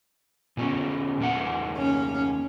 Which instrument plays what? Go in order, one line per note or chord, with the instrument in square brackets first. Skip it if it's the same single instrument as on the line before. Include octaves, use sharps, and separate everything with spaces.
[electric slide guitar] A#2 B3 C#4
E2 A#3 F#5
[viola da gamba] C#4